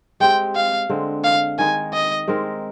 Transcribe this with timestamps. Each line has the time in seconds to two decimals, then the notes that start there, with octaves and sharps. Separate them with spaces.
0.20 G#3 C4 G4 G5
0.56 F5
0.89 D3 G#3 C4
1.24 F5
1.58 D#3 G#3 D#4 G#5
1.94 D#5
2.28 G#3 C4 D#4 A#4